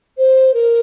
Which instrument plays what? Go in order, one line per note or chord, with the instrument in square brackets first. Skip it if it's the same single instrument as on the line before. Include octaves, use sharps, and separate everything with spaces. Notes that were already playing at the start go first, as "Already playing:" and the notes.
[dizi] C5
A#4